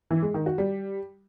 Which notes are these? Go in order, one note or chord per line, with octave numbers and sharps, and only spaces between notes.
E3
G#3
D#3
F#4
G3